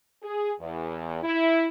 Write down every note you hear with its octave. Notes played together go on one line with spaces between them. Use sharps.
G#4
E2
E4